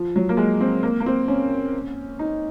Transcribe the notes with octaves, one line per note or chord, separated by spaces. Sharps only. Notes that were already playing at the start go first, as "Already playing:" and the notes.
Already playing: F3
F#3
A#3
G#3
C4
A#3
A#3
C4
C#4
D#4